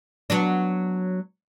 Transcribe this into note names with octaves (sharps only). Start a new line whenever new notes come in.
F#3 B3 D4